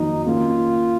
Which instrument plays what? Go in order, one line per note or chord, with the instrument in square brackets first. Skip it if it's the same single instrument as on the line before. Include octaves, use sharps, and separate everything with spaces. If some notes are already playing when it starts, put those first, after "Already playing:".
Already playing: [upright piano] F2 D#3 F#3 A#3 [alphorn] D#4
[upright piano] G#2 D#3 A#3 C#4 [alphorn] F4